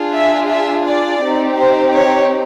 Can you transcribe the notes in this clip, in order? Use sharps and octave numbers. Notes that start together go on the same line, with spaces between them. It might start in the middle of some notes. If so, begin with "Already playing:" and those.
Already playing: D4 F4 G#4
E5
E5
D5
C4 D#4 G4
C5
C#5